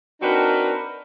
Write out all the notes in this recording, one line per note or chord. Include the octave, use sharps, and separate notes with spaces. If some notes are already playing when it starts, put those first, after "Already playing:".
C4 D4 D#4 F#4 A#4 B4